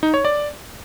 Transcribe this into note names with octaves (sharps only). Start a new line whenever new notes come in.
D#4
C#5
D5